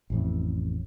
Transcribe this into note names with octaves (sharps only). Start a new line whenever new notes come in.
A1 F2 A2